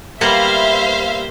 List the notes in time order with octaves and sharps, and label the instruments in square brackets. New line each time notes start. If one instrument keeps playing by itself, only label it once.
[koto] G3 A#3 B3 [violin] C5 [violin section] E5 F5